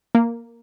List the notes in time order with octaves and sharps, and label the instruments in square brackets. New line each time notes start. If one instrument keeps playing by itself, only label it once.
[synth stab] A#3